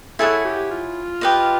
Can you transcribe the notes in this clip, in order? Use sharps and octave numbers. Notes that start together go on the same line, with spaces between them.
E4 G#4 A4 C#5 F#5
G4
F4
G4 B4 D#5